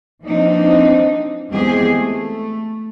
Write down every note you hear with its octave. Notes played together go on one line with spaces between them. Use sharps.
E3 F3 A#3 C4 D4 D#4
E2 G#3 C4 G4 G#4
A3